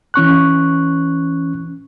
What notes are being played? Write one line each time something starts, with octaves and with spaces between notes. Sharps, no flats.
E3 C#4 C#6 F#6